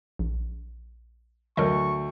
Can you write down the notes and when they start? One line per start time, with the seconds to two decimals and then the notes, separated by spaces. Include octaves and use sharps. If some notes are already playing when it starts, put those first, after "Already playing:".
0.19 A#1
1.57 D2 F#3 A#4 D#5 C#6